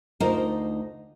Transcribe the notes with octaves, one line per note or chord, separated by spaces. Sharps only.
D2 D#4 F4 A#4 C5 D#5